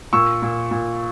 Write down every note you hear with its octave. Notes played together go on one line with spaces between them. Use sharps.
A#2 C#6 E6
A#2
A#2